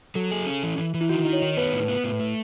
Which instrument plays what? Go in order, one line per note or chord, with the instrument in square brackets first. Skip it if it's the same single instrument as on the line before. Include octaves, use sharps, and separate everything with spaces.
[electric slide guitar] F#3 [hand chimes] A4
[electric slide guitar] G#4
C#4
E3
E3
E3
[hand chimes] E4
[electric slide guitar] D#3 [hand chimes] F#4
[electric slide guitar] D#4
[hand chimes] C#5
[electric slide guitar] D#3
[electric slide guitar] B3 [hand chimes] B4
[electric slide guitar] A2
B3
A2
A3